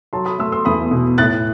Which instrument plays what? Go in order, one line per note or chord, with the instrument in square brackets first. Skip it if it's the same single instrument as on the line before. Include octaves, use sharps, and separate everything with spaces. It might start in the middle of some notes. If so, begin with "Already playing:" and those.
[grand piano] F#3 A5 C6
B5 D#6
A3 C6 E6
C6 E6
E2 B5 D#6
B2
A2 F#6 A6